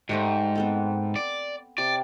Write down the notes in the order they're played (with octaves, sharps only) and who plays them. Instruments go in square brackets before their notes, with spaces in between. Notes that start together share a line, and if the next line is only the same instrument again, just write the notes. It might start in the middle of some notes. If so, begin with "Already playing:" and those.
[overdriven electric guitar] G#2 [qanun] G3 A3 C5
[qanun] B3 C4 A4
[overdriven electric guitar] D5
[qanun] C3 [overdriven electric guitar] D5